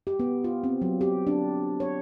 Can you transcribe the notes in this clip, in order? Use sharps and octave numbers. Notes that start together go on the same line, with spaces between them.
G4
B3
F4
C4
F#3
G4
D4
C#5